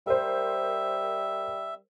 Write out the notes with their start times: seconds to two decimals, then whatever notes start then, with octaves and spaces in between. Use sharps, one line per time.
0.07 G3 A#4 C5 E5